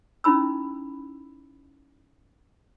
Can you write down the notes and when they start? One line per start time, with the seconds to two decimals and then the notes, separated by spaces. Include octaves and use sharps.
0.24 C#4 D#4 E4 B5 E6